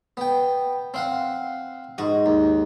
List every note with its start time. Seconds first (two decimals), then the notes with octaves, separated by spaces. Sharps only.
0.17 B3 G5
0.94 C4 F5 F#5
1.98 G#2 F#4
2.26 D#2